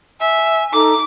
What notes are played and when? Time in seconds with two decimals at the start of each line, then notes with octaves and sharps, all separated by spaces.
0.21 E5 G#5
0.73 D#4 A4 A#5 D6